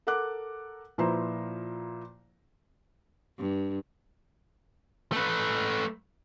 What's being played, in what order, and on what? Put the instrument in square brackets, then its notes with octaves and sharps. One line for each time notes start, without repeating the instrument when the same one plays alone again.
[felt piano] A4 A#4 F#5 D6 F#6
A#2 F3 E4 B4 C5 A#5
[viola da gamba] G2
[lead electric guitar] A3 B4